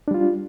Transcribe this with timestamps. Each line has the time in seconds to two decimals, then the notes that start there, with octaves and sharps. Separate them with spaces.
0.08 D4
0.11 G3
0.14 F4